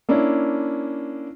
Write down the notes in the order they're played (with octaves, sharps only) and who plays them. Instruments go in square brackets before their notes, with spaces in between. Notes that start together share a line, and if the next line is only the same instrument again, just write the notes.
[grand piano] A#3 C#4 D4 E4